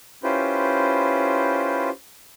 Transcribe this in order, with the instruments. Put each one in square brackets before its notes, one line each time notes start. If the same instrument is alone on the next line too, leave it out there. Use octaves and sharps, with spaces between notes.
[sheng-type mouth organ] C#4 E4 F4 G4 B4 C5